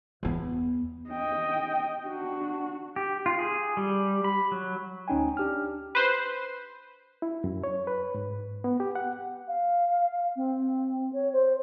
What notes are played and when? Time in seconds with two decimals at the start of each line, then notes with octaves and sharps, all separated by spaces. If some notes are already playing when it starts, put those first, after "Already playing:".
0.23 E2 B3
1.10 D#5 G5
2.07 D4 F#4
2.96 G4
3.26 F4
3.39 G#4
3.77 G3
4.24 B5
4.51 F#3
5.08 D2 C#4 D#4 G5 G#5
5.37 D4 G4 F6
5.95 B4 C5
7.22 E4
7.44 F#2
7.64 C#5
7.87 B4
8.15 G#2
8.64 B3
8.80 G4
8.95 F#5
9.48 F5
10.36 C4
11.13 C#5
11.33 C5